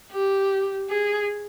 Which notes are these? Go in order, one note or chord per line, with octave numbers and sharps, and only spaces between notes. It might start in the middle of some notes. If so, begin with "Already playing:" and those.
G4
G#4